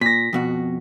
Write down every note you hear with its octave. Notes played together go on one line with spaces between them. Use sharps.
A#2 A#6 B6
F2 B2 F#4